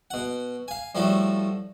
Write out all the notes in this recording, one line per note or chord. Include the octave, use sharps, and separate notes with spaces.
B2 F#5
F5 G#5
A2 F3 G3 A3 F#4